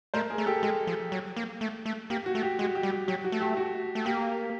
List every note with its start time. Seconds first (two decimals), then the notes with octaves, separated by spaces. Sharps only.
0.14 A3 A#4 C5
0.30 G#4 A#4
0.38 A3
0.46 G4 A4
0.63 G#3 G4
0.87 F3
1.12 F#3
1.36 A#3
1.61 A3
1.86 A3
2.10 A#3 G4
2.26 F#4
2.35 A3
2.43 G4
2.59 G#3 F#4
2.75 G4
2.83 G3
2.91 G4
3.08 F#3 G4
3.24 F#4
3.32 A3
3.40 G4
3.57 F#4
3.95 A3
4.06 A#3 G4